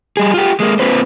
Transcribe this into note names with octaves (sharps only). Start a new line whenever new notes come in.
G3 G#4
F4 G4
G#3 A#3
A#3 C4 F4 B4 C5